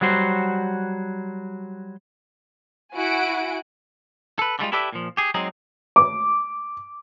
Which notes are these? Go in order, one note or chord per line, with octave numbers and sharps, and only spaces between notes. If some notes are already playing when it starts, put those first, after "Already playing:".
F#3 G3 F#4 C5
E4 F#4 F#5 G#5 D7
A4 B4
D3 G3 G#3 F4
E4 G4 A4 B4 D5 E5
A#2 F3
G4 G#4
F#3 G#3 C4 D#4 G#4
D6